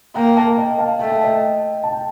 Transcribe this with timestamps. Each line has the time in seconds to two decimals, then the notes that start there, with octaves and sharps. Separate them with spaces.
0.16 A#3 G5 A#5
0.37 F5 A5
0.57 D#5 G5
0.78 F5 A5
0.99 A3 G5
1.12 A5
1.24 D#5 G5
1.83 A5
1.92 G5